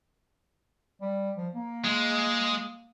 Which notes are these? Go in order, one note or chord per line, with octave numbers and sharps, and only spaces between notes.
G3
F3
A#3
G#3